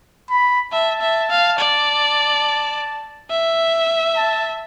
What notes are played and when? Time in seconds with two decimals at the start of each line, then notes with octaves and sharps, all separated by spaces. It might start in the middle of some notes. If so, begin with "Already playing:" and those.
0.30 B5
0.73 E5 A5
1.01 E5
1.30 F5
1.59 D5
3.30 E5
4.17 A5